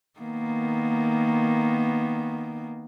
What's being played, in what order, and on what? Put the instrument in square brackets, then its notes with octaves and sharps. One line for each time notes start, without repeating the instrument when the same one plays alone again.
[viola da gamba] D#3 A#3 B3